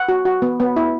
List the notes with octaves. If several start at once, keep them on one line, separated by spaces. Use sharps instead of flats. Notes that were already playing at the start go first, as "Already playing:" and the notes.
Already playing: F#5
F#4
F#4
B3
B3
E4